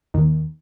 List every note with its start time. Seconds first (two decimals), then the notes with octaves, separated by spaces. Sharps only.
0.14 D#2